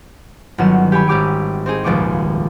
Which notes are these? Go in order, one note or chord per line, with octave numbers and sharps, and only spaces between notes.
G1 D#3 F#3 C#4 F#5 E7
G4 C#5 G#5 B5 E6
G#1 C#4 G4 D6 D7
C4 D#4 G#4
D#1 C#2 F3 G#3 C#6 D6